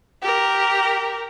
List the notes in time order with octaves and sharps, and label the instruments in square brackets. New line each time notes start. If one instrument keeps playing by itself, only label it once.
[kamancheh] G4 A#4